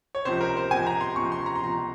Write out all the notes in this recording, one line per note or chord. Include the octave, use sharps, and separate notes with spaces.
C#5
C#2 C3 F3 C5
A#4
C5
C#2 C3 F3 G#5
A#5
C6
C#2 C3 F3 C#6
C6
A#5
C6
C#2 C3 F3 A#5